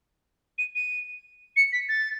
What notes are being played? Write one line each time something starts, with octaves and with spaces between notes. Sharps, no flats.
D#7
D#7
C#7
B6
A6